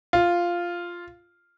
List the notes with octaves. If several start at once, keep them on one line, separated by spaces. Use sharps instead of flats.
F4